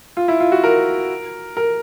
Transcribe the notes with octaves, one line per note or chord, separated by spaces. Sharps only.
F4
E4
F4
F#4
A#4
A#4